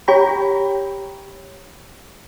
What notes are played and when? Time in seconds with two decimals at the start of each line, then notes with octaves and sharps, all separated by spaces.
0.08 G4 C#5 G5 A#5 B5